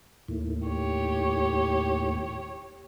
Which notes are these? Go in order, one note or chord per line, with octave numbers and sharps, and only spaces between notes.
D#2 A2
G4 C#5